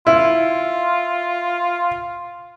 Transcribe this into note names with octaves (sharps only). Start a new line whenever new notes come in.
E4 F4